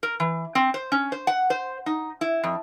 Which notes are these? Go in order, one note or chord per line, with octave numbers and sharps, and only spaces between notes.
A#4
E3
C4
C5
C#4
C5
F#5
C5
D#4
E4
F2